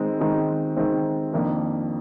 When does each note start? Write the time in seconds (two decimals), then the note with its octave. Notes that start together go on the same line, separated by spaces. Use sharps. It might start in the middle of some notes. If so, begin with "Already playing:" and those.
Already playing: D#3 G#3 C4 D#4
0.20 D#3 G#3 C4 D#4
0.77 D#3 G#3 C4 D#4
1.33 F2 D#3 A#3 D4